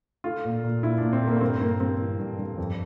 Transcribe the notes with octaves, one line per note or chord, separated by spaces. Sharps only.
A3 F4
A#2
A#2
A#2 E4
A#2 D4
C4
A3 A#3
A#3
G2 C4
G2 A#3
G2 C4
E3
G2
G2
F2